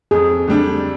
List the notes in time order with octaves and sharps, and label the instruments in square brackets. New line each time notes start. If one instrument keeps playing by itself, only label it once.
[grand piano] F2 [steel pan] G#4
[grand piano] D3 G3 D4